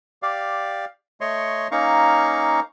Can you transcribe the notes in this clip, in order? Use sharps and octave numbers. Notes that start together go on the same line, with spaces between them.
G4 D5 F5
A3 C#5 D#5 C6 C#6
A#3 C#4 D#4 F5 A#5 C#6